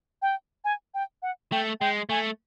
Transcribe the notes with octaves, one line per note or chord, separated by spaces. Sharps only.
G5
G#5
G5
F#5
A3 G5
G#3 G5
A3 G#5